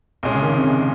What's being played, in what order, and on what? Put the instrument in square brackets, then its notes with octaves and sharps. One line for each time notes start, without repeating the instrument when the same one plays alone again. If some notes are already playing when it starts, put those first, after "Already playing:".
[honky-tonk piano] C2 A#2 G#3 C#4 G#4
[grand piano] C#3
D#3
C3
C#3